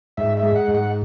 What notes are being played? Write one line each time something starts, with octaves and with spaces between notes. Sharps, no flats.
G#2 E5
E5
G#3
F#5
G#2
F#5